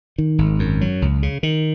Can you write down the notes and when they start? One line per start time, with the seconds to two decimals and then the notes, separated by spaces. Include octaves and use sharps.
0.18 D#3
0.38 G#1
0.59 F#2
0.81 F#3
1.02 C#2
1.23 C#3
1.43 D#3